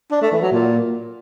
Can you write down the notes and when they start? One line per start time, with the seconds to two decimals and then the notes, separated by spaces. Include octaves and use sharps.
0.11 D4
0.22 A3
0.32 E3
0.42 F#3
0.52 A#2